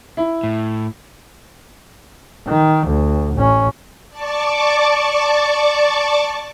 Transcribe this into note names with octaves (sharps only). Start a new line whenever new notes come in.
E4
A2
D#3
D2
A1 C#4
D5 A5 C#6 D6